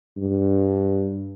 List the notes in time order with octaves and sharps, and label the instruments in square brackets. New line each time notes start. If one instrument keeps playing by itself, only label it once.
[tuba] G2